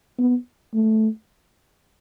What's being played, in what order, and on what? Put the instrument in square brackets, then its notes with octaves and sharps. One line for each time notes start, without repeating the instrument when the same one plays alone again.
[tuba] B3
A3